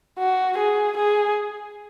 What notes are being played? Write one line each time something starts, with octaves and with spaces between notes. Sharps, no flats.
F#4
G#4
G#4